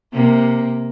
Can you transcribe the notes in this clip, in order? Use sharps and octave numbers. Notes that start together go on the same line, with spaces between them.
C3 A#3